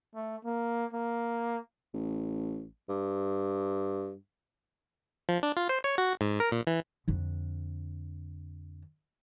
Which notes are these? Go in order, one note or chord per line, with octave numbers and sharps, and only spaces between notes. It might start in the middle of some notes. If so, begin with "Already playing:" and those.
A3
A#3
A#3
A1
G2
F3
D4
F4
C5
C#5
F#4
G#2
A#4
A#2
E3
F2 D3